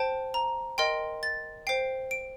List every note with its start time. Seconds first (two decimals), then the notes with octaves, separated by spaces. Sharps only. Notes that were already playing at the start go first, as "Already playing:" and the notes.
Already playing: C5 G5 A5
0.34 A#5
0.78 A#4 D#5 G5 C6
1.23 A6
1.67 C5 G5 C7
2.11 D7